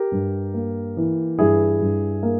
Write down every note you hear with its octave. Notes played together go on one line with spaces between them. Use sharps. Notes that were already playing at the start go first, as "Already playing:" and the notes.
Already playing: G4 A#4
G2
A#3
E3
G2 E4 G#4
G2
A#3